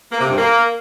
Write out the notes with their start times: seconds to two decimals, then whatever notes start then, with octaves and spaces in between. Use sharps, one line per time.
0.12 A#3
0.21 C3
0.29 G2
0.38 A#3